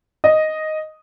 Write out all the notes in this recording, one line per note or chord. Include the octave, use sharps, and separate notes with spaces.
D#5